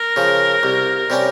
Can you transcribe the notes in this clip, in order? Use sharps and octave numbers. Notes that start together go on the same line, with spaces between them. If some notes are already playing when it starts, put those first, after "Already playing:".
Already playing: A#4
C#3 F3
C2
C3 G3 C#4